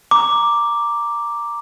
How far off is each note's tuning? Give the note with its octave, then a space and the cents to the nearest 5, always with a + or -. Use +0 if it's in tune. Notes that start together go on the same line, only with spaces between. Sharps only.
A#5 +0 D6 +0